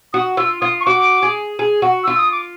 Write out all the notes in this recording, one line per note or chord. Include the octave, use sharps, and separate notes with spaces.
F#4 D#6
F4 E6
F4 D#6
C#6
F#4 D6
G#4
G#4
F#4
F4 E6
D#6
D6